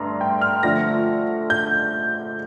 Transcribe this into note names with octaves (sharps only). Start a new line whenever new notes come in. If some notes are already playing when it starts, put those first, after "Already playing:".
Already playing: G2 D3 A3 A#5 C6
G5
F6
D3 F3 A3 A#6
G6